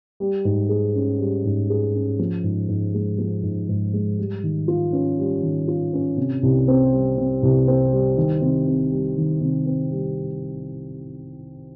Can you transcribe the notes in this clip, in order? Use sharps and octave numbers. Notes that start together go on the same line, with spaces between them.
G3
G#2
G#4
C#4
G3
G#2
G#4
C#4
F3
G#2
G#2
G#3
F3
G#2
G#2
G#3
G3
D#3
F4
C#4
G3
D#3
F4
C#4
C3
C2
C4
G3
C3
C2
C4
G3
D#3
C3
C4
G3
D#3
C3
C4
G3